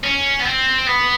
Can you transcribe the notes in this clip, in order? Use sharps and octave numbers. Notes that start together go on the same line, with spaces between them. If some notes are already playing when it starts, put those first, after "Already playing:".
C#4
B3
C4
B3